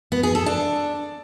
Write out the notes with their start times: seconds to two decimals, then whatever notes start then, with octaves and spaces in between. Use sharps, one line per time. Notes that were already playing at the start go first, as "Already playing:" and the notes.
0.12 B3
0.23 G#4
0.35 A4
0.46 D4